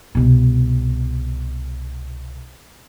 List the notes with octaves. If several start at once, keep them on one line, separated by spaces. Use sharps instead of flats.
C2 B2